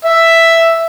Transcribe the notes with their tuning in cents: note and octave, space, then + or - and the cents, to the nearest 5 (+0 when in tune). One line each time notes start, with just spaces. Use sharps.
E5 +5